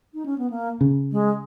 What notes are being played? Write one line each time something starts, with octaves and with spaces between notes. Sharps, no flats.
D#4
C#4
B3
A#3
C#3
G#3